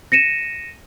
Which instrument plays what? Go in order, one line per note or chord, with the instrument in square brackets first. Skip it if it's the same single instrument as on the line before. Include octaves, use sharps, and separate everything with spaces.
[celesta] A#6 C#7 D#7 E7